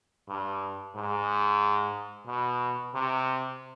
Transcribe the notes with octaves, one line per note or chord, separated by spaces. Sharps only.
G2
G#2
B2
C3